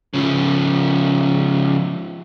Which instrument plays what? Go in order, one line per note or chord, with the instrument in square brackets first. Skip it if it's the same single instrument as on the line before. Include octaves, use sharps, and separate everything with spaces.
[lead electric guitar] C#3 F3